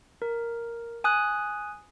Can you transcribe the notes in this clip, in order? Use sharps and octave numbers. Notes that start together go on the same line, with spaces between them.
A#4
G#5 D#6 F#6